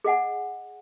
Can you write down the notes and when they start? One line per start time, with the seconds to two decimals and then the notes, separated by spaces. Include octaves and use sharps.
0.04 G#4 D#5 F#5 G#5